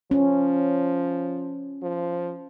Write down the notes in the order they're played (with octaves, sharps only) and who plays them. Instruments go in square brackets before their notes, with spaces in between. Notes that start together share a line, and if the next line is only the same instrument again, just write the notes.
[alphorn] F3 [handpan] C#4
[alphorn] F3